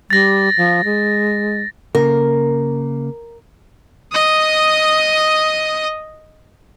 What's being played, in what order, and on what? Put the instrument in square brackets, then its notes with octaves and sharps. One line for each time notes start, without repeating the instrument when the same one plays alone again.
[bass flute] G3 [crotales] A6 A#6
[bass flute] F3
G#3
[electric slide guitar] C#3 A#3 [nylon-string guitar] A#4
[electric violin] D#5 D#6